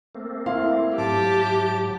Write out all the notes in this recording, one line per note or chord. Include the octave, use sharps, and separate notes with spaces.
A3 A#3 C4
E4 F5 C6
G#2 F#3 G4 A5 D6